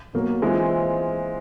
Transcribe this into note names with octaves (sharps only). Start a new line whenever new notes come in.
B2 F#3 A#3
E3 G#3 C4 F4